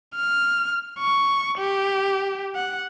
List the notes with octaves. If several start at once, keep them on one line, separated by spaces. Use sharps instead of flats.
F6
C#6
G4
F#5